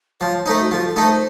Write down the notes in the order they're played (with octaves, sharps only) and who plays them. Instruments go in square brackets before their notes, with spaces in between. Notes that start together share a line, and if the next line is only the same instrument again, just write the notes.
[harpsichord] F3 [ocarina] C#5
[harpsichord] A3 D#4 [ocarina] C5
[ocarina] F#4
[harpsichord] F3 [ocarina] A4
[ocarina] A4
[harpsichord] A3 D#4
[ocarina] C5